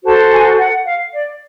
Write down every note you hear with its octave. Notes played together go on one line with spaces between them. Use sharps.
F#4 A4 C5 A5
G#5
F#5
F5
D5